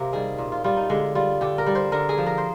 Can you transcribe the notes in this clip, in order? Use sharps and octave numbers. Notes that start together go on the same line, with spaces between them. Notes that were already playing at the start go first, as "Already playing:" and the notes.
Already playing: C3 A#3 C4 F4
D#3 G3 G#4
A#2
F4
G3 F4
D#4
D3 G#3
G3 F4
D3 G4
A#4
G3
C5
D3 A#4
G#4
F3
A#4
C5